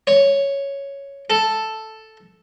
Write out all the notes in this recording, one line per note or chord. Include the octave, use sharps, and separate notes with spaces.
C#5
A4